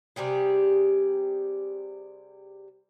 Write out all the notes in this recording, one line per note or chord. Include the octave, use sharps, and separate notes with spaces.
C3 G3 G4 G#4